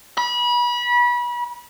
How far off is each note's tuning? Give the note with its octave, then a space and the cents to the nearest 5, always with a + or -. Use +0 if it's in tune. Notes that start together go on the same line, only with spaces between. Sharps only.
B5 -30